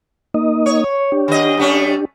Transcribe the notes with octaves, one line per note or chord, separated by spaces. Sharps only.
A#3 D#4 D#5
C#5
D4 G4
D#3 D#5
F#2 A3 C#4